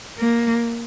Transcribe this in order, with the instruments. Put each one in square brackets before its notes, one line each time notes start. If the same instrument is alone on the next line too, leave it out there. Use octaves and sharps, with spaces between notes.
[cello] A#3